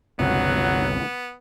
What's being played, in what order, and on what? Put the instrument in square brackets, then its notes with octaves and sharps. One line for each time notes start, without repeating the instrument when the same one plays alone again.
[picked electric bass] G1 C#2 C3 [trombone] F#3 [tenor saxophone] B3